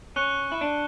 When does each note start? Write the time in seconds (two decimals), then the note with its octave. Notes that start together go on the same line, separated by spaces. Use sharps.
0.16 C#4 C#6 F#6 C#7 G7
0.52 E4
0.61 D4